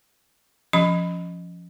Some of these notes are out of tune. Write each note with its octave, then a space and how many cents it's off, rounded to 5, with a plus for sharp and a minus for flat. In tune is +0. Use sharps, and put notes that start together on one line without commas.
F3 -10 C#4 +0 B5 +15